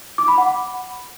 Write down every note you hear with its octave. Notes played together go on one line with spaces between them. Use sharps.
D6
B5
F#5